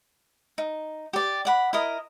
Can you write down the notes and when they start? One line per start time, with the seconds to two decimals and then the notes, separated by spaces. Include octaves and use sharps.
0.58 D#4
1.13 G4 D5
1.45 D5 F#5 B5
1.73 E4 A#4 D#5